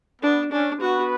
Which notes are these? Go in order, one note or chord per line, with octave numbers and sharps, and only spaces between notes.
B3 D4
C#4 D4
B3 F#4 B4